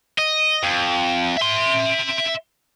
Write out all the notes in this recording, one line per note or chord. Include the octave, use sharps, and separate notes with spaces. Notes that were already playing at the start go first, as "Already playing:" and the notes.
D#5
F2
E5 C6